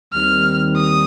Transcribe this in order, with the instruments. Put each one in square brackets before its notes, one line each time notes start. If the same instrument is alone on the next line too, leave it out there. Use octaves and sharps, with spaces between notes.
[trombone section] D#2 D#3 G3 C4 [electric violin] F6
[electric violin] D#6